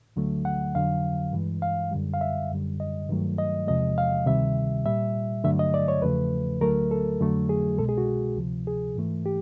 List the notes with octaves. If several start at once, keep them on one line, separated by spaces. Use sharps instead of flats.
D2 D3 F#3 A3
F#5
F2 D3 F#3 F5
G2 E3 G#3
F5
F#2 D3 G3
F5
E5
F#2 D3 G3
D#5
G2 D#3 F#3 A3
D#5
E2 C3 F3 G#3 D#5
F5
D2 C3 D#3 G3 E5
A#2 G3 E5
G2 D3 F#3 A3 E5
D#5
D5
C#5
E2 C#3 F3 A3 B4
D2 D3 F#3 A3 A#4
A4
F2 D3 F#3 A3
G#4
C2 B2 G#3 A4
G#4
F#4
D2 C3 F3
G#4
G#2 E3 A3
G4